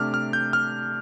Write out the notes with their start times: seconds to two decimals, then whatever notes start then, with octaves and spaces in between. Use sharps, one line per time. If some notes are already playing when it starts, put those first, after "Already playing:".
Already playing: C3 A3 D4 D6 F6
0.14 F6
0.33 G6
0.53 F6